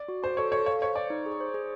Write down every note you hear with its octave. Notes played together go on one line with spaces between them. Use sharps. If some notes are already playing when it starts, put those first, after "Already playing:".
Already playing: D5
F#4
F#4 C5
A4 C#5
A4 C#5
C#5 F5
C5 C#5
C5 D5
D#4
G#4
C5
G#4